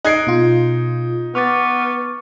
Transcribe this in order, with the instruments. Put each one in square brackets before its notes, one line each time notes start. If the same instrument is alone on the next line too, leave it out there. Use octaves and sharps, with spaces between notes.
[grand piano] D#4 G#6 C7 [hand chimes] G#4 D7 [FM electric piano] F#6
[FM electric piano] B2 F4
[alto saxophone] B3 [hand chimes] C#6 D6 A6 [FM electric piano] F6